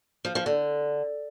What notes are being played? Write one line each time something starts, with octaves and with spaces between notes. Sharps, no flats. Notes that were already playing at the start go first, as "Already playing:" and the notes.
F3
F3
D3